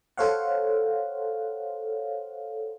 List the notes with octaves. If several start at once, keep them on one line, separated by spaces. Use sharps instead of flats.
A4 C5 C#5 F5 F#5